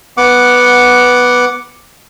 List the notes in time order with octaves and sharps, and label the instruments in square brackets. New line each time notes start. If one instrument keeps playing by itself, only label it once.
[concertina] B3 F#5 D6